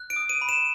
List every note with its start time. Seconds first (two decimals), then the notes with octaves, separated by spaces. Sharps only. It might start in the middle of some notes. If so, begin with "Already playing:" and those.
Already playing: F#6
0.10 D7
0.16 D#6
0.29 D#7
0.42 B5
0.49 E7